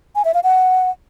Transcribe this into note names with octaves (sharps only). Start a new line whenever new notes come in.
G#5
E5
F5
F#5